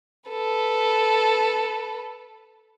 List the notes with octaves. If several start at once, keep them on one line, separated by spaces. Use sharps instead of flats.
A4 B4